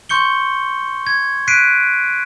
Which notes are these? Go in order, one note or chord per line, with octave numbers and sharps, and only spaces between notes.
C6 C#6 G6 C#7 G7
G#6
F#6 B6 C7 D7 D#7